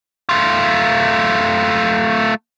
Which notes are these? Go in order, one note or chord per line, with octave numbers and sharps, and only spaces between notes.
A3 F4